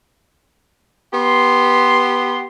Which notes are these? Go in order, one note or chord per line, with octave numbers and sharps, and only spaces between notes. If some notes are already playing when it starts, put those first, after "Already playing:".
B3 G4 C6